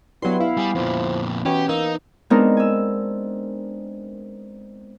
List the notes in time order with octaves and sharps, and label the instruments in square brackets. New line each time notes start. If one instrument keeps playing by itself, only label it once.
[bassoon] G2 [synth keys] F#3 C6 [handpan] B3 E4
[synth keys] E4 [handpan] F5
[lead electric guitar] G3 [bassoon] G#4
[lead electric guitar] F2 A#2 [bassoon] F3
[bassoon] B2 [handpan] E3 [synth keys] C#4 [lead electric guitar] G4
[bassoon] A#3 [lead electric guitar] D#4 [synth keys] E6
[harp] G#3 B3 C4 D4 D#4 A#4
G#5 E6